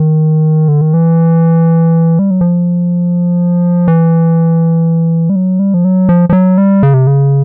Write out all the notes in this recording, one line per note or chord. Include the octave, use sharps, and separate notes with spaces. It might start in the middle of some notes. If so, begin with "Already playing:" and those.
Already playing: D#3
D3
D#3
E3
G3
F#3
F3
E3
G3
F#3
G3
F3
F#3
F3
F3
F#3
G3
C#3
C3
C#3